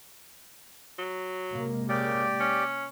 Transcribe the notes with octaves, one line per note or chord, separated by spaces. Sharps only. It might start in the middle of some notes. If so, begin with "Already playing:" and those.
F#3
C3 G#3 A#3
C#3 G4 D5
C#4